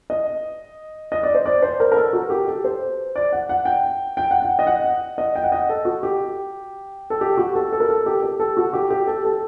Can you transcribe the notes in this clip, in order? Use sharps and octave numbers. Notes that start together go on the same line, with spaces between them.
D#5
D#5
D5
C5
D5
C5
A#4
A#4
A4
F#4
G4
A4
C5
D5
F#5
F#5
G5
G5
F#5
G5
D#5
F#5
D#5
G5
F#5
D#5
A4
F#4
G4
A4
G4
F#4
A4
A4
A#4
A4
G4
G4
A4
F#4
G4
G4
A4
A4